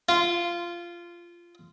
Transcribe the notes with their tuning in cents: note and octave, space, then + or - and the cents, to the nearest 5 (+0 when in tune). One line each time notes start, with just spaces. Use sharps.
F4 -15